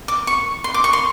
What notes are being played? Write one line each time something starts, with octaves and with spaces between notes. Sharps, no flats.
D6
C#6
C6
D6
C#6
C6